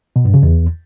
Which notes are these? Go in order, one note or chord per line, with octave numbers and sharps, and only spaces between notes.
B2
G2
C#3
E2